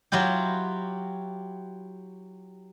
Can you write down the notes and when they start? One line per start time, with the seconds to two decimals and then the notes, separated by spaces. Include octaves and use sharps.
0.12 F#3 E4 F4 G4